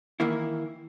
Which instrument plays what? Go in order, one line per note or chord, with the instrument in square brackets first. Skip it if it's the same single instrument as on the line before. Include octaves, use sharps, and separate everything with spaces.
[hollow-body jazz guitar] D#3 E3 A#3 E4